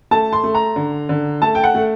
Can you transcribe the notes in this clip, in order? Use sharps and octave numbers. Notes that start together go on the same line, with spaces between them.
A3 A5
C6
A3
A#5
D3
D3
A3 A5
G5
F#5
A3